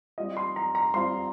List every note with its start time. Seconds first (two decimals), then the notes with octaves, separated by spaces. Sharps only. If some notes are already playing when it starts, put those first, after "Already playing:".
0.18 G3 C4 F4 D#5
0.37 C6
0.56 A#5
0.75 A#5
0.94 G3 C4 F4 C6